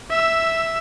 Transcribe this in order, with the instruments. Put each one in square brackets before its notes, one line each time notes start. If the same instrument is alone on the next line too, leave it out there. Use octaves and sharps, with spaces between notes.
[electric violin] E5 E6